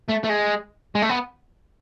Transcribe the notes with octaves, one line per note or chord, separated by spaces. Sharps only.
A3
A3
G#3
G#3
A3
B3